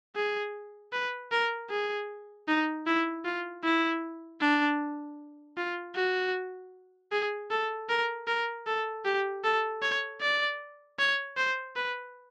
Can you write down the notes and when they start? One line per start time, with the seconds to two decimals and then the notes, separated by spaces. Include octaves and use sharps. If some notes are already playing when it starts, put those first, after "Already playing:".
0.16 G#4
0.93 B4
1.32 A#4
1.70 G#4
2.48 D#4
2.86 E4
3.25 F4
3.64 E4
4.41 D4
5.57 F4
5.95 F#4
7.12 G#4
7.50 A4
7.89 A#4
8.27 A#4
8.67 A4
9.05 G4
9.44 A4
9.82 C#5
10.21 D5
10.99 C#5
11.37 C5
11.76 B4